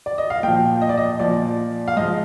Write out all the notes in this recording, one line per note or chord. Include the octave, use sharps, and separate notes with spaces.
D5
D#5
F5
A#2 F3 G5
D#5
D5
D#5
A#2 F3 D5
F5
G#2 F3 D#5